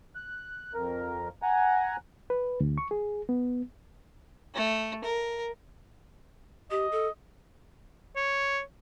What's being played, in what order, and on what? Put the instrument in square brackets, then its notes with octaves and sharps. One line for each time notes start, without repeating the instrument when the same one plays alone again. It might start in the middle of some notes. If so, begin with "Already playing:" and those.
[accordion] F#6
F2 A#4
F#5 G#5 A#5
[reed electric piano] B4
D2
C#6
G#4
B3
[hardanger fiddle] A3
A#4
[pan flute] G4 [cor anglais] D#5
[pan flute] A4
[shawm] C#5